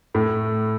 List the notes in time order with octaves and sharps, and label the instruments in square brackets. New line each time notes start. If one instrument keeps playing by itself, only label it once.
[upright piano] A2